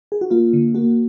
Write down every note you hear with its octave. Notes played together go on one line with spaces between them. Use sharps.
G#4
F#4
A#3 F4
D3
A#3 F#4